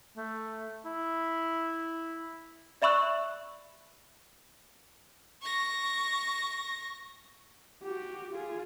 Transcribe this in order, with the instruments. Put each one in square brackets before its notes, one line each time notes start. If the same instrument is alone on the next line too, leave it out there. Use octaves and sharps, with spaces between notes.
[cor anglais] A3
E4
[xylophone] D5 E5 B5 C#6 E6 F#6
[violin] C#6 A#6
[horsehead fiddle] F#4 G4
F4 G#4